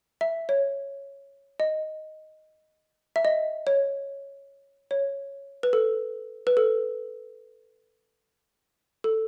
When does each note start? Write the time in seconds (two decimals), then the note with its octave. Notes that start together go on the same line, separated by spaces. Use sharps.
0.21 E5
0.49 C#5
1.60 D#5
3.16 E5
3.25 D#5
3.67 C#5
4.91 C#5
5.63 B4
5.73 A4
6.47 B4
6.57 A4
9.04 A4